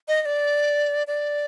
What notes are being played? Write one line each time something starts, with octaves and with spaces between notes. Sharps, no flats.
D#5
D#5
D5
D5